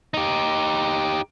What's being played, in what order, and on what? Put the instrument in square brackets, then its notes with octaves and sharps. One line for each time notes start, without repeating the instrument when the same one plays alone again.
[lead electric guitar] D#4 G4